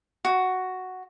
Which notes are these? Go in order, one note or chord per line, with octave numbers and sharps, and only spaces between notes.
F#4